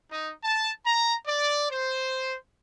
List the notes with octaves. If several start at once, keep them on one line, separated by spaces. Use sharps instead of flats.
D#4
A5
A#5
D5
C5